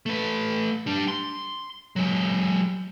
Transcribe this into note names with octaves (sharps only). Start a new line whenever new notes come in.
A3 B4
G3 D4
C6
F#3 G#3